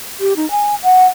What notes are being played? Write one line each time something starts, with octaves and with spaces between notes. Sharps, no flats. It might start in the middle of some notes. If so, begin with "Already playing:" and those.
G4
D#4
G#5
F#5